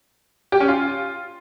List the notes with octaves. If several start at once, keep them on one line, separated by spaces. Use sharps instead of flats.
G4
C#4
F4